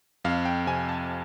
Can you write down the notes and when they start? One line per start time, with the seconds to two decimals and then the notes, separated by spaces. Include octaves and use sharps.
0.25 F2 F5
0.45 G5
0.67 C3 G#5
0.89 A5